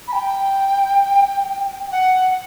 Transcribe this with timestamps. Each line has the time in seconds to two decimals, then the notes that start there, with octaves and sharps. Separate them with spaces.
0.07 B5
0.12 G5
1.91 F#5